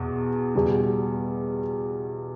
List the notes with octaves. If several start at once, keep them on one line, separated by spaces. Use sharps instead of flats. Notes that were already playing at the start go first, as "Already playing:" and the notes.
Already playing: E2 B2
E2 B2 G3